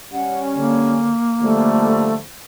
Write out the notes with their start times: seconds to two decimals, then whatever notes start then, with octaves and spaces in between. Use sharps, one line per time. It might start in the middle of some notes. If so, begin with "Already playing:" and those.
0.12 G3 C#4 F#5
0.54 D3 A#3
1.41 D3 F3 G3 A3